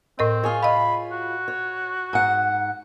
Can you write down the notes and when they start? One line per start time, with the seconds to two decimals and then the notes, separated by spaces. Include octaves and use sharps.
0.19 A2 C4 A#4 D#5
0.43 F4 G#4 C#5
0.63 D#5 F5 B5
1.12 F#4
1.48 C#5
2.13 G#2 F#5